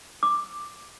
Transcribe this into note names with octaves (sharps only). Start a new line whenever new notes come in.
D6